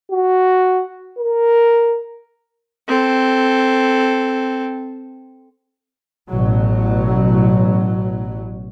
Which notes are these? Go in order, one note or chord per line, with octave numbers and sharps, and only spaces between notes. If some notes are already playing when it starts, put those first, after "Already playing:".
F#4
A#4
C4 A4
A1 B2 F#3